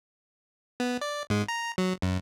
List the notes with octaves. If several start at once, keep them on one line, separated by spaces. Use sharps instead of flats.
B3
D5
G#2 G#3
A#5
F#3
F#2